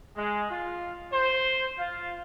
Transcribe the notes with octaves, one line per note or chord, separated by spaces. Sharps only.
G#3
F4
C5
F4